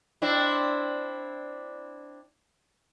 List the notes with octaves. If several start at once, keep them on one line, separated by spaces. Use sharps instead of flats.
C4 D4 E4